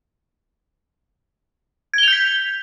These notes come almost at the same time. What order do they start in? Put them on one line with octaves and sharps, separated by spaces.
G#6 G7 F7 G6 B6